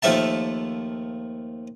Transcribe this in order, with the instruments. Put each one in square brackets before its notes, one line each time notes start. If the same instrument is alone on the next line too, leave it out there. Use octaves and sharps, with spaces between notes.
[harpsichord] D#2 F3 A3 E5 A5